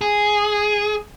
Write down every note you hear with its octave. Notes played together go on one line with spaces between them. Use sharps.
G#4